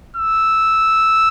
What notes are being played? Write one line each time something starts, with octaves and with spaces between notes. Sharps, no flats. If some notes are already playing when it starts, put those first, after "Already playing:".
E6